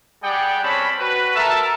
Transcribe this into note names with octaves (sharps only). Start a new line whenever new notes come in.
G3 G#4 D5 F#5 G5
C4 C#4 A5 B5
F#4 B4
A4 A#4 E5 A5